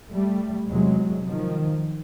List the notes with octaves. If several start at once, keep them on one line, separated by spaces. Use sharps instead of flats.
G3 A3
E2 C3 F#3 G#3
D#3 F3